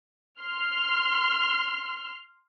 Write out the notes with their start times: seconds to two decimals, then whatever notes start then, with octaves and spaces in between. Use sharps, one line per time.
0.42 C6 F6